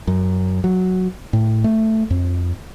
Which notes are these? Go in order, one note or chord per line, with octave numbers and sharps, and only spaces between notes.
F#2
F#3
A2
A3
F2